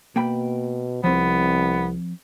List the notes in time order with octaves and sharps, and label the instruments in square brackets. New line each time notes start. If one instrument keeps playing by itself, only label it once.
[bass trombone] B2 [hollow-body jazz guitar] A#3 G5 B5
[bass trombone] C2 [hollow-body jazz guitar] F3 C4 [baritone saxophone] B3